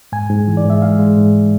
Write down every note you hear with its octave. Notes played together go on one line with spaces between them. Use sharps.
G#2 G#5
G#2
E3
D5
G#2 E5
G#3 F5
G#3
G#2